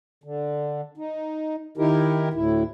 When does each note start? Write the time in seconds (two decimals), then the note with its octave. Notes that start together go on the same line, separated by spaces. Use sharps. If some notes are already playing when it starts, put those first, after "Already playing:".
0.24 D3
0.98 D#4
1.77 D#3 D#4 E4 G4 A#4
2.34 D2 A2 E4